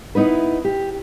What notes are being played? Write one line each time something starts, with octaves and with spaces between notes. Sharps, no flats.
B3 D#4 E4 B4
G4